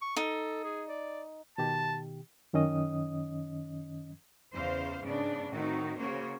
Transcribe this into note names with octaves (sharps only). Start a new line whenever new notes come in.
C#6
D#4 A4
G#4
D5
B2 D#3 G4 A5
F#2 D#3 C#4 D#5 D#6
E2 C#3 C5 F5
G#2 C#3 B3 D4 D5
A2 D#3 C4 D#4 F#4
C#3 A#3 C#4 F#4 C5 C#5